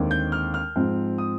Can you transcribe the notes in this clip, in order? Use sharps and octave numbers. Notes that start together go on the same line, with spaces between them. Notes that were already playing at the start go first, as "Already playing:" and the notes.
Already playing: D#2 D3 G#3 C4
G6
F6
F6
G#2 F3 C4
D#6